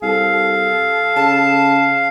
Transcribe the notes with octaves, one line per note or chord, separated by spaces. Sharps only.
C2 A4 F5
C#3 A5